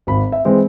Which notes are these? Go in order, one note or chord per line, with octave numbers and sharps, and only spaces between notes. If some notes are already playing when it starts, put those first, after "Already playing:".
G#1 B5
E5
E3 G#3 C4